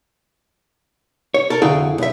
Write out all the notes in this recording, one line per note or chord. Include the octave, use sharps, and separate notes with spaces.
C#5
A4 A#4
F2 D3 E4 F#4 G#4 G5
B1 E5